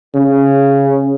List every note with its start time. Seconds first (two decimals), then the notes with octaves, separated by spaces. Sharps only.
0.15 C#3